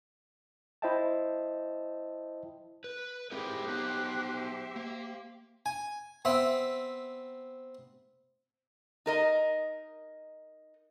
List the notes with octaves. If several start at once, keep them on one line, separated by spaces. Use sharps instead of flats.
E4 C5 D#5 E5 G5 A5
B4
C4 E4 G4 G#4 A#4 C5
B3 D#4 F#6
E5
A#3
G#5
B3 C4 E5
D#4 A#4 D#5